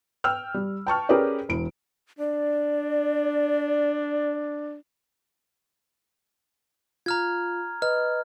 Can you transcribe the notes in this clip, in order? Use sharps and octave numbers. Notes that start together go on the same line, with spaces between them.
G5 E6 F6
G3
G5 A5 C#6 F6
C#4 G4 G#4 A#4 B4 D5
E1 E4 D7
D4 D5
F4 A#5 F6 G#6
B4 D#5 F6